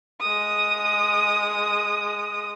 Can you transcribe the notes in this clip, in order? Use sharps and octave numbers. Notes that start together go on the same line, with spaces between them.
G#3 D#6